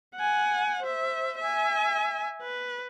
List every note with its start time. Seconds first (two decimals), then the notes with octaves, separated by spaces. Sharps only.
0.15 F#5 G#5
0.83 C5 E5
1.38 E5 G#5
2.42 B4